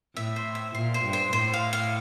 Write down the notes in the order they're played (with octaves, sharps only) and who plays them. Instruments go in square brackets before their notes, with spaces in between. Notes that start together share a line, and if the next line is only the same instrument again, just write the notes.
[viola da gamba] A2 [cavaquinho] E5
[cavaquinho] C5
E5
[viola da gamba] A#2 [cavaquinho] C6
[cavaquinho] C5
[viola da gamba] G2
[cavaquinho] C5
[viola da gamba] A2 [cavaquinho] C5
[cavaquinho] F5
F5